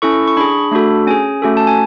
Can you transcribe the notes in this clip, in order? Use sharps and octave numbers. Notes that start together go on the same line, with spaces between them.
C#4 E4 A4 C#6
C#6
D4 G#4 B5
A3 D4 F#4 A4
C#4 G#4 G#5
A3 C#4 F#4 A4
A5
G#5